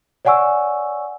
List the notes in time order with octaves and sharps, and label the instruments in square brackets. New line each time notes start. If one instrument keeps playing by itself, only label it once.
[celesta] C#5 D5 F#5 G#5 C#6 E6